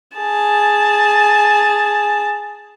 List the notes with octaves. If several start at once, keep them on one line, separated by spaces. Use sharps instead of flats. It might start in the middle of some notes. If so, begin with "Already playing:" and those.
G#4 A5